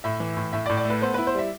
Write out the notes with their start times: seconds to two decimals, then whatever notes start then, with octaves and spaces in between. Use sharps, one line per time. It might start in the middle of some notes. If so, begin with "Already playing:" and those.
0.04 A2 E5
0.20 E3
0.37 A2
0.53 A2 E5
0.66 D5
0.69 A2
0.77 D5
0.85 A3 B4
1.02 B3 C5
1.14 E4 B4
1.27 C5
1.35 G3 E5